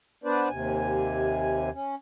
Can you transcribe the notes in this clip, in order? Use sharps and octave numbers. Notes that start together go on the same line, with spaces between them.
B3 D4 B4 C5 D5
D#2 C3 G#5
C#4